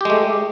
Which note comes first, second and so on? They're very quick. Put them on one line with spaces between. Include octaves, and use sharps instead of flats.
G4 G#3 A3